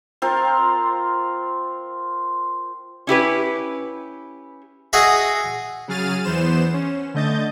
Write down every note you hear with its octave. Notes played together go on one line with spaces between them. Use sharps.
C4 F4 A#4
C#4 E4 G4 B4
F#4 G#4 D#5 E5
C#3 F#3 G#4 F6 A6 D#7
E2 E3 B3 C5 E7
C#4
D3 A3 D#5 G6 A6